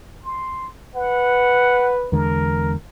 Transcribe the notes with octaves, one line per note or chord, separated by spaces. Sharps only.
C6
B4 F#5
E2 D3 G#3 A#4